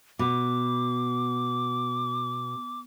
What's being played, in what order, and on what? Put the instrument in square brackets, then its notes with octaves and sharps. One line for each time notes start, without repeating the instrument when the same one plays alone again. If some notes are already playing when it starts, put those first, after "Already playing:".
[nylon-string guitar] B2 [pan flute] D6